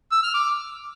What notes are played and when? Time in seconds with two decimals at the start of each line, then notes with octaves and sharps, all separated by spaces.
0.12 E6
0.23 F6
0.34 D6